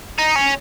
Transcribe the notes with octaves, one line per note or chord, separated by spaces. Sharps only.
D#4
C#4